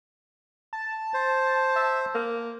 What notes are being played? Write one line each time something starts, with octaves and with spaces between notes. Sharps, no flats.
A5
C5
E5
A#3